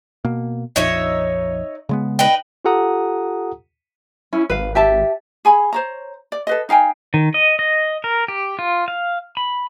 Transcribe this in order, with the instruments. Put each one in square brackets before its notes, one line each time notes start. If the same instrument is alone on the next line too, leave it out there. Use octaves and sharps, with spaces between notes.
[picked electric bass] B2 A#3
[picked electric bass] A#1 F2 [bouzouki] D#4 C#5 E5
[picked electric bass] C#3 G#3 B3
[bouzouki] D#4 B4 G5
[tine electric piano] F4 G4 A4 F#5 A#5 D#6
[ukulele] C#4 [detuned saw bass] E4
[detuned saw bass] G#1 [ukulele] B4 F5
[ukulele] G4 E5 A5
G#4 G#5 B5
C5 C#5 A#5
D5
A4 B4 D#5
D#4 F5 G5 G#5
[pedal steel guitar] D#3
D#5
D#5
A#4
G4
F4
F5
B5